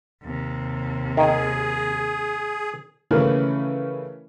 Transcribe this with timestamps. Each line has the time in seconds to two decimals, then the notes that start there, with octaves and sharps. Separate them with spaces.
0.23 D#2 C3
1.17 D#3 G#4
3.11 C#3 E3 A3 C#4 A#4 B4